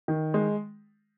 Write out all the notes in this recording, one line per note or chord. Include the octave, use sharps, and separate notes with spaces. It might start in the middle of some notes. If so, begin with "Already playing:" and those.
D#3
G#3